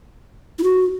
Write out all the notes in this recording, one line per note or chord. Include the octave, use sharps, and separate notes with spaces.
E4
F#4